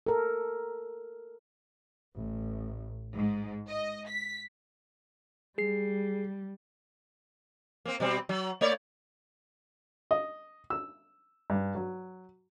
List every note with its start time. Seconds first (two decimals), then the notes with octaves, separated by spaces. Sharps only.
0.07 A4 A#4
2.17 A1
3.17 G#2
3.68 D#5
4.08 B6
5.58 G3 G#4 C7
7.85 A#3 C4
8.00 B2 G3 C4
8.29 F#3
8.61 A3 C#5 D5
10.11 D#5
10.70 E6
11.50 G2
11.75 F#3